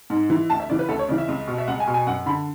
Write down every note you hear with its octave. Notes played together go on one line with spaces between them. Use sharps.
G#2
E3
D2 A5
E5
C#3 E3 D5
B4
D2 A4
C#5
C#3 E3 D5
E5
C#2
B2
E5
C#2 F#5
G#5
B2
G#5
F#2 F#5
D3 B5